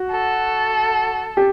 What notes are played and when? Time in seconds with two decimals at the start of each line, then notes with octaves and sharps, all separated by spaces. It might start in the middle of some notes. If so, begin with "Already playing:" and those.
Already playing: F#4
0.12 A4
1.37 G4